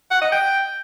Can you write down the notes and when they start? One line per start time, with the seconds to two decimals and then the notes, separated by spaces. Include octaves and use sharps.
0.11 F#5
0.21 D#5
0.32 G5